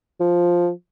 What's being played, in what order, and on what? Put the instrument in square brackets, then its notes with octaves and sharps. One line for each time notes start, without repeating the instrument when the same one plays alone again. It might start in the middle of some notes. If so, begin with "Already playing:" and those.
[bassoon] F3